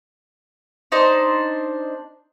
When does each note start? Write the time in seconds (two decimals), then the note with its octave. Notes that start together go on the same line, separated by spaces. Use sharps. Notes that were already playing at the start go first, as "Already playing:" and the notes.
0.92 D4 D#4 C5